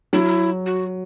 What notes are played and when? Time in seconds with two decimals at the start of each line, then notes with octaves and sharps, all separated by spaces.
0.13 F#3 E4
0.66 F#4